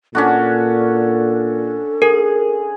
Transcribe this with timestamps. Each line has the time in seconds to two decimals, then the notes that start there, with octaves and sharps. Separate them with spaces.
0.15 A#2 C#4 D4 F#4 A4
2.02 G#4 A#4